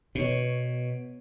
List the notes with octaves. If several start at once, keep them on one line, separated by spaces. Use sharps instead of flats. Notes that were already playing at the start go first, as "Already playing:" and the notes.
B2 B3 C#5